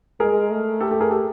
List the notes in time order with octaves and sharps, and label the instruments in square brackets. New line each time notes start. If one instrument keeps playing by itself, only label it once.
[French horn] G#3 [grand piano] G#4 A#4
[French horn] A3
[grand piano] G4 A4
G4 A4
G#4 A#4
G4 A4